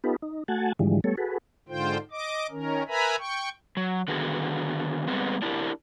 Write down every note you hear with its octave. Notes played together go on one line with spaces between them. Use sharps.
B3 D#4 F4 G4 A4 B4
D#4
A3 F#4 F#5 G#5 A5
G#2 D3 E3 F3 G3 G#3
G3 A3 B3 A4 C#5
F#4 G#4 A4 B4
G#2 D3 F4 C5 G5
D#5 D6
D#3 C#4 A#4
A#4 B4 E5 G#5 A#5 B5
G5 C#6
F#3
D3 D#3 B3 F#4 G#4
G3 G#3 B3 C4
D4 E4 G4 A#4